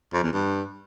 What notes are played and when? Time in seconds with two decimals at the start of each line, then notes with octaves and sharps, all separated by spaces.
0.13 F2
0.23 E2
0.33 G2